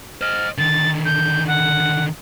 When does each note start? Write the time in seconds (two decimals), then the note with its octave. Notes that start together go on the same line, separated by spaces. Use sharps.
0.21 C5 D#5 F6
0.58 D3 D#3 A6
1.05 G6
1.47 F#5